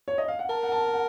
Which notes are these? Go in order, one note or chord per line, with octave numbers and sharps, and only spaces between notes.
C#5
D#5
F5
F#5
A#4 A5
F#5
A5
F#5